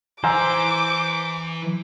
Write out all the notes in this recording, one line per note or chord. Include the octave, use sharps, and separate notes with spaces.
E3 C5 G#5 A#5 D6 E6